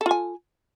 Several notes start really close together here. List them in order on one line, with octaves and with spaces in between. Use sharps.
A4 F4 G#5